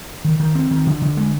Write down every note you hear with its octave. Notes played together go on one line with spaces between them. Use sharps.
D#3
D#3
C4
D#3
D3
D3
G#3